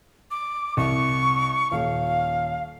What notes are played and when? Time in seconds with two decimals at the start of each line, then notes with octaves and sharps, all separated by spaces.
0.31 D6
0.77 C2 C#6
1.71 D#1 F5